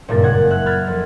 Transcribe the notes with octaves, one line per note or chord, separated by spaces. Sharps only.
F#1 G2 A#2 G3 A#4 A6
G#3 F#5 G#6
E5 F#6
B5 F6 G#6 A6
F2